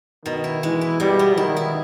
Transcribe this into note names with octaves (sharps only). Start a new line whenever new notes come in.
B2 D#3
E4
E3 G#3
E4
B2 G3
B3
D#3 E4
E4